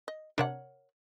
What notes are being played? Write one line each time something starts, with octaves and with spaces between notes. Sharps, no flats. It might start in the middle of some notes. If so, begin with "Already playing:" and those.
D#5
C3 D4 A#4 C#5 F#5